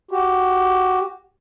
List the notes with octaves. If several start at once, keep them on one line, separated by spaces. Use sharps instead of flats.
F#4 G4